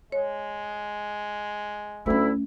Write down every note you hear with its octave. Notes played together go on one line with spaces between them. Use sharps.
G#3 C#5
D2 A3 C#4 E4